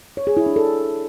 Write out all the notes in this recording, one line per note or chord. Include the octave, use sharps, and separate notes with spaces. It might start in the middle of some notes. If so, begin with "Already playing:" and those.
C#5
G#4
E4
D4
A4